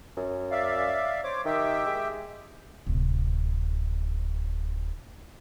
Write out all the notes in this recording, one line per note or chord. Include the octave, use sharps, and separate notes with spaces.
F#2
D5 E5 F5
C5 C#5 D6
D#3 G4 E5 G5
G#3
D1 C3